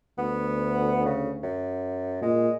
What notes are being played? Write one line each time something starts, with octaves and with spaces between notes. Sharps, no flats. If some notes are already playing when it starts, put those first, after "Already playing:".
D2 B3
C#3
F#2
A#2 G#3